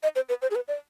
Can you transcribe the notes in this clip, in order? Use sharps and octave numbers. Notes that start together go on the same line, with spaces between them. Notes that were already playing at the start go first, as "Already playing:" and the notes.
D#5
C5
B4
C5
G#4
B4
D5